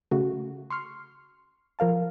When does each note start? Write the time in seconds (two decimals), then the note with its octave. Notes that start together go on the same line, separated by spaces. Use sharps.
0.11 C#3 A3 F#4
0.70 C6 C#6 F6 C7
1.79 F3 A#4 F5 A5